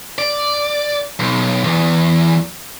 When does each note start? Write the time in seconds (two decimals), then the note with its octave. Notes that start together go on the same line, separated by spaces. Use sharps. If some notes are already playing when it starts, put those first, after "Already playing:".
0.18 D5
1.19 B1
1.64 E2